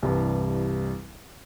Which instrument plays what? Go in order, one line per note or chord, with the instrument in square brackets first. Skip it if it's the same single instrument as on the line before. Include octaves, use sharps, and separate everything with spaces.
[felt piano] C2 G2 E3